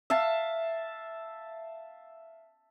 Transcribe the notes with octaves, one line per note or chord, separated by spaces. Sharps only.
E5 F5 A5